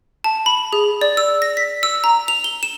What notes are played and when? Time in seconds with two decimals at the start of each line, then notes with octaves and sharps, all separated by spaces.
0.24 A5
0.46 B5
0.73 G#4
1.01 D5
1.17 E6
1.42 A#6
1.57 B6
1.83 E6
2.04 A#5
2.28 F7
2.44 G7
2.63 E7